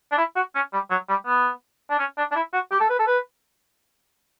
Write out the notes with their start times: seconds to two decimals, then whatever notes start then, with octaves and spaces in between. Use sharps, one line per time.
0.12 D4
0.18 E4
0.36 F#4
0.55 C#4
0.73 G3
0.90 F#3
1.09 G3
1.26 B3
1.90 D4
1.99 C#4
2.18 D4
2.31 D4
2.35 E4
2.53 F#4
2.71 G4
2.80 A4
2.90 B4
2.99 A4
3.07 B4